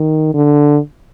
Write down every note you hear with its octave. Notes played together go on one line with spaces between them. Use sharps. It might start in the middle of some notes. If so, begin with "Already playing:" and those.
Already playing: D#3
D3